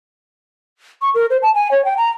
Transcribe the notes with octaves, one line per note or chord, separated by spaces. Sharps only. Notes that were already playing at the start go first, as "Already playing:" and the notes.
C#6
A#4
C5
A5
G#5
C#5
G5
A#5